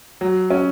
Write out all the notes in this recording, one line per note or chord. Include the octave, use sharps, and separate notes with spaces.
F#3
C#4